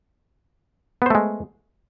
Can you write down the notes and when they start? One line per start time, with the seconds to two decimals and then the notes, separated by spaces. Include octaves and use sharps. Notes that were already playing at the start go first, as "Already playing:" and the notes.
1.02 B3
1.06 C5
1.10 A3
1.15 G#3